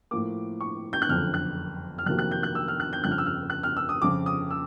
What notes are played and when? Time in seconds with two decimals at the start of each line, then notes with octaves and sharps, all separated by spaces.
0.11 A2 F3 A#3 D6
0.61 C#6
0.93 G6
1.02 F#6
1.09 F#1 F2 D3 F6
1.34 F#6
1.98 F6
2.06 F2 C3 D#3 F#3 A#3 F#6
2.19 F#6
2.31 G6
2.43 F#6
2.55 E6
2.68 F6
2.80 F#6
2.93 G6
3.04 G1 F2 C#3 F#6
3.11 F6
3.18 E6
3.26 F6
3.50 F#6
3.63 F6
3.77 E6
3.89 D#6
4.02 F2 C#3 F3 D6
4.26 D#6
4.51 E6